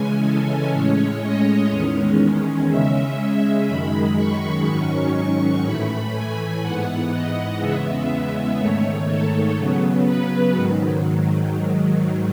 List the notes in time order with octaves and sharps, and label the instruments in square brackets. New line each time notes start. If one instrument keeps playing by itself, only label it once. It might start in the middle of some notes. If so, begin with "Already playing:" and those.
Already playing: [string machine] C#3 E3 G#3 C#4 G#5
A4
A2 G#3 C#4 C#5
D#5
E2 D#3 G#3 C#4
C#3 G#3 C#4 E5
F#2 D#3 G#3 B5
C#6
G#2 D#3 F#3 C#4 C#6
A2 E3 A3 B5
G#5
G#2 E3 B3 F#5
D#5
E2 C#3 G#3 B3 E5
E5
G#2 D#3 A3 C#5
A4
C#3 F#3 B3
B4
G#2 D#3 F#3